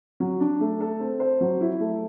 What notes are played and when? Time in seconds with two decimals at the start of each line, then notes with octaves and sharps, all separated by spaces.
0.20 F#3
0.40 D4
0.60 A3
0.80 A4
1.00 C4
1.20 C5
1.41 F#3
1.61 E4
1.80 A3